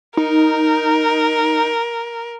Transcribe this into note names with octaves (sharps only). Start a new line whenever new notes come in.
D#4 A#4